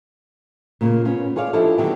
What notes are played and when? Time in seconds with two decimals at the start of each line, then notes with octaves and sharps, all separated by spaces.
0.81 A#2 C#3 A#3
1.05 B3 C#4 F4
1.36 F4 G#4 C#5 D5 F5
1.53 F3 D4 E4 G4 A4 D#5
1.78 D3 D#3 F#3 B3 D4 G4